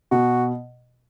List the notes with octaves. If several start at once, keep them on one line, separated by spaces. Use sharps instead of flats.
B2 F#4